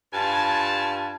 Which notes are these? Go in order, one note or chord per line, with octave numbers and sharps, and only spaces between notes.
G2 F4 G#5 A5